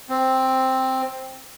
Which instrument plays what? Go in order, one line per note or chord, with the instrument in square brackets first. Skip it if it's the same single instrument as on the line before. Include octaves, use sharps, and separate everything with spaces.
[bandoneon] C4